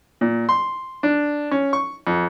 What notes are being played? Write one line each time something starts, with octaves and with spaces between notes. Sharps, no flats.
A#2
C6
D4
C#4
C#6
F2